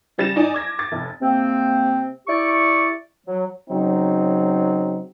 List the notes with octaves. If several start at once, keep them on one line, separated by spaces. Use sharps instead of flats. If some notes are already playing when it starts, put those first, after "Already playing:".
C#3 G3 A6 A#6 E7
D#4 D5 G#5
D6 G#6 A#6
D6 A6
F1
C3 A#3 C4
E4 G4 D5 C#6
F#3
C#3 F#3 C4 D#4